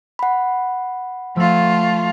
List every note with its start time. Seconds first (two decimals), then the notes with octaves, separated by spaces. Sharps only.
0.19 F#5 B5
1.36 F3 A3 F4 E6 G#6